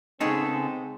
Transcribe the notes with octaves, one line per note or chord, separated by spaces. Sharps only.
C#3 G#3 B3 C4 D#4 G#4 A4 C#5